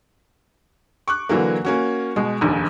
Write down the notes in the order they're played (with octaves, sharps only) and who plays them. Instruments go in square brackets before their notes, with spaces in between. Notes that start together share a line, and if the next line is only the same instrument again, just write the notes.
[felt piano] C#6 D6 F#6
D3 E3 F#3 A#3
A#3 C#4 F#4
B2 G#3
F1 A#1 D#2